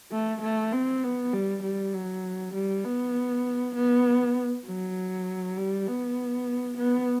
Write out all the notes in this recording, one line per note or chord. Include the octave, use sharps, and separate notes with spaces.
A3
A3
C4
B3
G3
G3
F#3
G3
B3
B3
F#3
G3
B3
B3